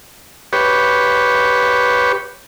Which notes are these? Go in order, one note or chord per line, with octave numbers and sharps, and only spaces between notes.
G4 B4 C#5